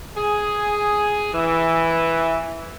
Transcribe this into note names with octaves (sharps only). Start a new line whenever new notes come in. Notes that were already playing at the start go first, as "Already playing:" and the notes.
G#4
E3